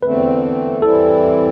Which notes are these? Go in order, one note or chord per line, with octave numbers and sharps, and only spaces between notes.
E2 D3 A3 C4 B4
E3 G3 C4 E4 A4